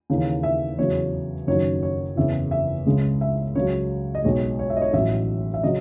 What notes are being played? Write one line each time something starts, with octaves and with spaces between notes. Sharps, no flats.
D#2 C#3 E3
E5
E2 C#3 F#3 C#5
F#1 F#2 D#3 F#3 C#5
C#5
F#1 E2 C#3 E3 E5
E5
C#2 C#3 G#3
E5
C#2 C#3 F#3 C#5
D#5
B1 B2 G#3 C#5
C#5
E5
D#5
C#5
A1 A2 F#3 E5
E5
C#3 F#3 D#5